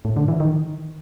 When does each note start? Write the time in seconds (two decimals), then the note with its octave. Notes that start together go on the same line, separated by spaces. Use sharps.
0.05 A2
0.17 D3
0.28 E3
0.40 D#3